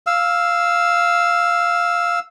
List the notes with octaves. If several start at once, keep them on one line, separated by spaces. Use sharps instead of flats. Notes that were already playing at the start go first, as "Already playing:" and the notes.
F5 E6